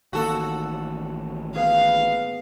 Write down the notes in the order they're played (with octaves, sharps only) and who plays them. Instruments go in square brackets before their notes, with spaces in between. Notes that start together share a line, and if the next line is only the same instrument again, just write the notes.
[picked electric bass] A1 D#3 A#3 [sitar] F#4 A4
[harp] B3 G#4 B4 [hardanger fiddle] F5